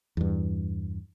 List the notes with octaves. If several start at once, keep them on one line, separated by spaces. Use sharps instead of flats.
E2 G2